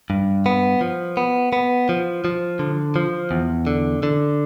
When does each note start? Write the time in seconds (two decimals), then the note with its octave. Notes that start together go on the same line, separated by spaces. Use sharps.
0.10 G2
0.46 B3
0.81 F3
1.17 B3
1.53 B3
1.89 F3
2.25 F3
2.59 D3
2.96 F3
3.31 E2
3.67 D3
4.03 D3